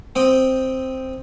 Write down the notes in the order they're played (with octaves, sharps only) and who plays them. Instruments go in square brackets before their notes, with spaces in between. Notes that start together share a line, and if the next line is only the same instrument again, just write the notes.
[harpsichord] C4 D#5 G5